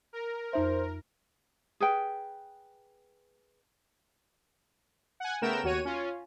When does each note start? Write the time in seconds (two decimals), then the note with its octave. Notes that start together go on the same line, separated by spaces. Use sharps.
0.13 A#4
0.53 F2 D#4 C5 E5
1.80 G#4 B4 G5
5.20 F#5 G#5
5.42 C#3 A3 B3 A#4 G5 E7
5.64 D#2 F#4 C#5 D#7
5.85 C#4 F4